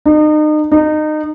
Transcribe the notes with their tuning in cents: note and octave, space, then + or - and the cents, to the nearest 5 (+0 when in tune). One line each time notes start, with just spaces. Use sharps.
D#4 -35
D#4 -25